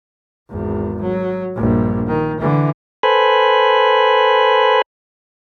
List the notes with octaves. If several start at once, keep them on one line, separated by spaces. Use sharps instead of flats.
G#1 E2
F#3
A#1 G2
D#3
D3 E3
A4 B4 C5 G#5 B5